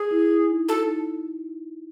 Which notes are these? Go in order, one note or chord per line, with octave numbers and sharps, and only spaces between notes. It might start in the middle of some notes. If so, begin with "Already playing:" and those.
Already playing: G#4
E4
E4
D#4
F#4 A4
D#4